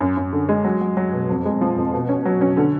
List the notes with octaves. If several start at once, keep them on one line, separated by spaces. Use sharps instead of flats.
F#2
F#2
D3
G#3
F#3
F#3
F#3
B2
F2
G#3
F3
F2
B2
C#4
F#3
C#4
D3